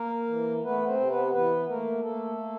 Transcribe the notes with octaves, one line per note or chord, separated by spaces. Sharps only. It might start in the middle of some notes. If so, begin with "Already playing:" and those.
Already playing: A#3 A#4
E3
A3 B3 B4
C4 C5
C3
B3 B4
E3 B3 B4
A3 A#3 A#4
A3 A#3 A4
A#3